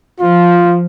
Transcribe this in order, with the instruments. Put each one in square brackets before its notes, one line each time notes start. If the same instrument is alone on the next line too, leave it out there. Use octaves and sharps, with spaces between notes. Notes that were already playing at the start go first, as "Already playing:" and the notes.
[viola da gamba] F3 [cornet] F4